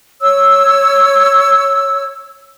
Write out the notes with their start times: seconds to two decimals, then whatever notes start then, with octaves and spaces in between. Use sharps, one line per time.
0.21 C#5 E6